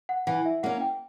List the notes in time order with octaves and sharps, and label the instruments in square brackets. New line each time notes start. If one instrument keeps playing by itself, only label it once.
[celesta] F#5
[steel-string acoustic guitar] E3 [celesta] F#5
[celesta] E5
[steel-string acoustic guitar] A#3 C#4 [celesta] F#5
[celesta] G5